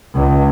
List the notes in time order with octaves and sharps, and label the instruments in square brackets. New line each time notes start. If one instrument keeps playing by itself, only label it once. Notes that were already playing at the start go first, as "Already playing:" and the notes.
[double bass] C#2